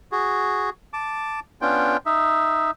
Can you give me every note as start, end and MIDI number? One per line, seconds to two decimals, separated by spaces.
0.12 0.70 66
0.12 0.70 68
0.93 1.40 81
0.93 1.40 86
1.62 1.97 59
1.62 1.97 61
1.62 1.97 62
1.62 1.97 65
1.62 1.97 79
2.06 2.71 63
2.06 2.71 76